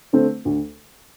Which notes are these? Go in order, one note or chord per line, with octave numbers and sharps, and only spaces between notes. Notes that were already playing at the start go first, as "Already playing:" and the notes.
D3 A3 C4
D2